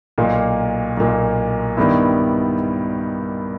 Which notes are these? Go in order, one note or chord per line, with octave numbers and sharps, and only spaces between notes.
B1 A#2 A#3
B1 A#2 A#3
G2 D#3 G3 B3 E4